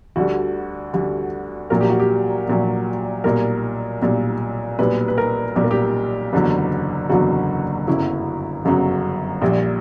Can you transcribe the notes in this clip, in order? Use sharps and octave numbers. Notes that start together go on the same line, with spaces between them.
D2 D3 G3 F#4
D2 D3 G3
A#1 A#2 F#3 A#4
G4
F#4
G4
A#1 A#2 F#3
B1 A#2 G3 A#4
B1 A#2 G3
B1 A#2 G3 B4
B4
A#4
B1 A#2 G3 G4
A#4
G4
F#1 E2 D3 F#3
F#1 E2 D3 F#3 F#4
G1 F#2 C#3 F#3 E4
G1 F#2 C#3 F#3
A#1 A#2 G3